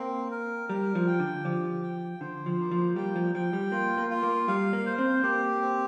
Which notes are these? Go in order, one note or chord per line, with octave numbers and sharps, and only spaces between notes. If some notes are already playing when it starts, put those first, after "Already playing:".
Already playing: A#3 C4
A#4
G3 A#4
F3
G5
D3
F3 G4
G5
D3 C5
F3
A#3
F3
G3 G5
F3
F3 G5
G3
A#3 F4
A#3
F4
A#3
G3 F5
A#3
C5
C4
A#3 G4
C4